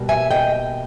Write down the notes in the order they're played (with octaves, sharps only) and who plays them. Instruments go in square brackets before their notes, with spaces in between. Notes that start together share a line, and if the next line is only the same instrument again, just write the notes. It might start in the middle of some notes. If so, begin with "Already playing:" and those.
Already playing: [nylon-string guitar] B2 G3 A#3
E5 G#5
D#5 G5